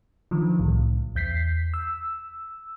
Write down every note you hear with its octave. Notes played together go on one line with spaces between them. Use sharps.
D3 D#3 F3
C2 A2
E2 G6 B6 C7
E6